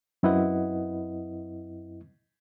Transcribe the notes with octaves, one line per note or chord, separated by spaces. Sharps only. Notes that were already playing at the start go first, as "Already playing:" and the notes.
F#2 C4 E4 B4 D#5 F#5